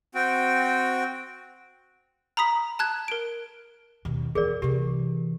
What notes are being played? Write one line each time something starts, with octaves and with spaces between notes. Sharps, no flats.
C4 F#4 G5
A#5 B5 D#6 B6
A5 F#6 G#6
A#4 D7
D#2 B2
E2 G#4 A#4 D5
C3 E3 G4